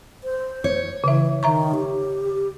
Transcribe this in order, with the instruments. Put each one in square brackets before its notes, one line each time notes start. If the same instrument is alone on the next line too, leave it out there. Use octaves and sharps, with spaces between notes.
[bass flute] C5
[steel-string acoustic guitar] C#5
[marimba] C#3 E5 [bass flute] E3
[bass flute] D#3 [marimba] E5 A#5 C#6
[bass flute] G4